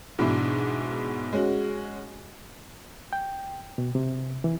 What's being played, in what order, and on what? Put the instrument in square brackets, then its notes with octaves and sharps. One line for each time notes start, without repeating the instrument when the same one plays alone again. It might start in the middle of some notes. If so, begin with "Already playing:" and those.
[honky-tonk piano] G#2 B2 E3 D4 E4
G#3 C#4 F#4
[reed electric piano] G5
B2
C3
E3